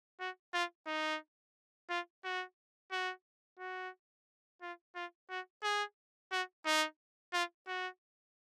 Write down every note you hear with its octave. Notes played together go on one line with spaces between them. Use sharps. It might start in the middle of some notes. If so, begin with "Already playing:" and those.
F#4
F4
D#4
F4
F#4
F#4
F#4
F4
F4
F#4
G#4
F#4
D#4
F4
F#4